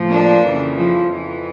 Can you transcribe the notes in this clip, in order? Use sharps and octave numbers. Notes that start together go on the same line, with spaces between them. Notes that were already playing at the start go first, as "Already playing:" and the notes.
Already playing: A2 F3
A#3 D4
F2 C#3 E3
F3
F2 E3